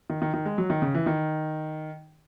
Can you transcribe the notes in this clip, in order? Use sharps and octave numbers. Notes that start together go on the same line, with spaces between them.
D#3
D#3
D#3
G#3
F#3
D#3
C#3
E3
D#3